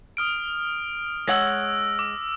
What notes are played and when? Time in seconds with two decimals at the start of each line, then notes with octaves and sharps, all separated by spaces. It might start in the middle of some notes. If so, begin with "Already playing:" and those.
0.17 D#6 F6 D7
1.27 G#3 C#5 F#5 E6 A#6
1.99 D6